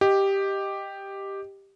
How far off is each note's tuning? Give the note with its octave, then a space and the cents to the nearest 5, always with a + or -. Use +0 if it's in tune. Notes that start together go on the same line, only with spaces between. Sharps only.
G4 +0 D#5 +0